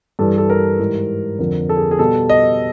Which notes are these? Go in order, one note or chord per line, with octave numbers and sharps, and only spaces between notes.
G2 E3 G3 A4
A4
A#4
G#2 E3 G3
F2 D3 F3 A#4
A4
G#4
G#4
B2 G3 A4
D#5